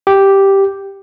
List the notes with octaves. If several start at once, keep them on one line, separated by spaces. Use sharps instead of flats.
G4